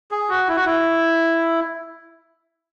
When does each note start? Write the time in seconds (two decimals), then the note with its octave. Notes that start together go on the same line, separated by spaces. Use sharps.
0.11 G#4
0.29 F#4
0.48 E4
0.56 F#4
0.65 E4